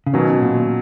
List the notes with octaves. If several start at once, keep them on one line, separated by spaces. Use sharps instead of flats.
C#3
B2 D#3 F#3 C#4
A#2